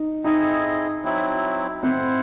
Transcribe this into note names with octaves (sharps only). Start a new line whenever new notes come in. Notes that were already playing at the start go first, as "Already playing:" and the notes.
Already playing: D#4
C4 D#4 E4 G#4 D#5
F#3 C4 E4
C4 E4 C5 F#5